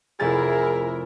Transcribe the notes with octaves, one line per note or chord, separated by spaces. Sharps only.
F1 E4 G#4 A#4 A6